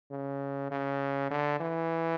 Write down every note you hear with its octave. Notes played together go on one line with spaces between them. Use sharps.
C#3
C#3
D3
E3